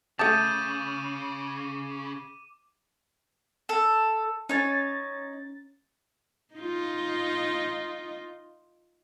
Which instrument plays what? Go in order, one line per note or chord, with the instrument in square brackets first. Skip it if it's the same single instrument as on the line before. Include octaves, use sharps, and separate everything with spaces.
[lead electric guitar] C#3 [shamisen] A3 A5 [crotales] D6 D#7 [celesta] D#6 G6 A6
[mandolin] A4
[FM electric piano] C#4 A6 [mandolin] D#4 C#5
[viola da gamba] D#4 F4